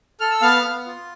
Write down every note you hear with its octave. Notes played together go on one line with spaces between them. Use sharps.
A4 F6
E6
B3 F5 F6
B3
F4